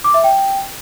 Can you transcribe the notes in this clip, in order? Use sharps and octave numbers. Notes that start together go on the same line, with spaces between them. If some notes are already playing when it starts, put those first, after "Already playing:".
D6
E5
G5